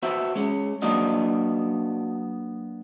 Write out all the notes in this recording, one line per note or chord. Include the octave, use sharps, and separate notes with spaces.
B3 F#4 C5 E5
G#3 C#4
F#3 A#3 B3 D4 F#4 D#5